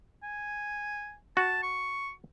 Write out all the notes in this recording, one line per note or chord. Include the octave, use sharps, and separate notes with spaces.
G#5
F#4 A5
C#6